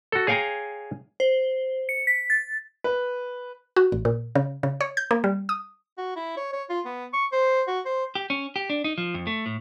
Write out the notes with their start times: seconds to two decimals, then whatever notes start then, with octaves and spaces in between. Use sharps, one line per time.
0.12 F#4 A4
0.27 G#4 C#5 F5 G5 G#5 A#5
1.20 C5
1.89 C#7
2.07 B6
2.30 A6
2.84 B4
3.76 F#4
3.92 A1
4.05 A#2
4.35 C#3
4.63 C#3
4.81 C#5
4.97 G6
5.11 A#3
5.24 G3
5.49 D#6
5.98 F#4
6.16 E4
6.37 C#5
6.53 C#5
6.70 F4
6.85 B3
7.13 C#6
7.32 C5
7.67 F#4
7.86 C5
8.15 G4
8.30 C#4
8.56 G4
8.70 D4
8.84 D#4
8.98 F3
9.14 F2
9.27 A3
9.46 A2